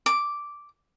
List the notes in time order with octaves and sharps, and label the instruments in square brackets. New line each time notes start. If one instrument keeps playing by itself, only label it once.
[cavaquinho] D6